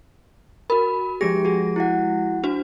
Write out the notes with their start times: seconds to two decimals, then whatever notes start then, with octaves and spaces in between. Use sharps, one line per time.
0.70 F#4 A#4 B5
1.21 F3 G#3 G4 G#4 A#6
1.45 F#4 G#4
1.76 E4 F#4 F#5
2.43 D4 F#4 C5